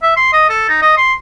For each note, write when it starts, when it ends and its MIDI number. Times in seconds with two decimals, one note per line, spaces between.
0.03 0.14 76
0.17 0.29 84
0.33 0.48 75
0.49 0.65 69
0.69 0.81 63
0.82 0.94 75
0.97 1.14 84